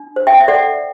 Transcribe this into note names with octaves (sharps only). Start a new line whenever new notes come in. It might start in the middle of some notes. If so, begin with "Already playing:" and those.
Already playing: D4
C5
E5 G5
E5
A4 D5 F#5